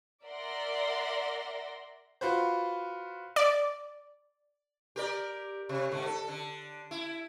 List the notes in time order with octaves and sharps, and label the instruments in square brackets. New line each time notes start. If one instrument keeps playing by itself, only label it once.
[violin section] A#4 D5 E5 F#5 C6 A#6
[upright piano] F4 F#4 B4 C5
[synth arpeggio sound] D5
[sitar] G4 A#4 D5
C3
G#2 D3
A4
D3
E4